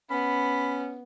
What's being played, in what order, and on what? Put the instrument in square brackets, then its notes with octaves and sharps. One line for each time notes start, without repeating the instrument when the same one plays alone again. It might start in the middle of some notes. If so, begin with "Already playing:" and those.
[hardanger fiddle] B3 [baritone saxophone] C#4 [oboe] B5